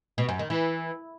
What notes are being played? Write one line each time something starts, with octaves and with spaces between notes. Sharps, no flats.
B2
F#2
D#3
E3